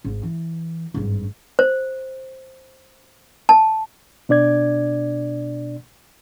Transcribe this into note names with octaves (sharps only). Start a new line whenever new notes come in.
G#1
E3
G#1 G2
C5
A5
B2 D4 D5 G#6